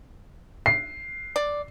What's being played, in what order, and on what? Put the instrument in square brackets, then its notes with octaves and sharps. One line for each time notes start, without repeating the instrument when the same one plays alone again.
[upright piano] C7
[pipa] D5